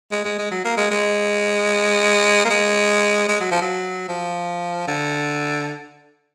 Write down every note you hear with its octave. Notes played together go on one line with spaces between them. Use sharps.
G#3
G#3
G#3
F#3
A#3
G#3
G#3
A#3
G#3
G#3
F#3
F3
F#3
F3
D3